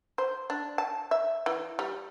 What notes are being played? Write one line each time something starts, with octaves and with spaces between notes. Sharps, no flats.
C5
D4
A5
E5
E3
G3